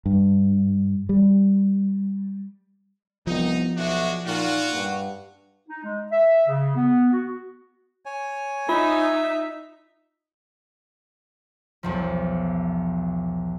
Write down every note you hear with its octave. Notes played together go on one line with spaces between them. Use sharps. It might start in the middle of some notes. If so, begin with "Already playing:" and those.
G2
G3
C2 F3 B3 D#4
B1 G#3 D4 F#4 E5
A#2 D#4 F4 F#4
G2 F#5
D#4
G#3
E5
C#3
B3
F#4
C#5 G#5
D#4 F4 E5
B1 E2 F3